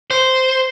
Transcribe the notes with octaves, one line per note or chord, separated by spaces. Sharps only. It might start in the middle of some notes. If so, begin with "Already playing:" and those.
C5